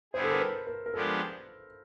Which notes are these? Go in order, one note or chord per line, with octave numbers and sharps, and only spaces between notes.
D3 G3 B3 E4 G#4 C5
A4
A#4
B4
A#4
A#4
F3 G#3 B3 D4 G4 A4